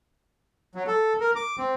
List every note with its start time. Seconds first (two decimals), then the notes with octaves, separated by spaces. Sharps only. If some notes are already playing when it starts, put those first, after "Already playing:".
0.75 F#3
0.87 A4
1.20 A#4
1.36 D6
1.58 C4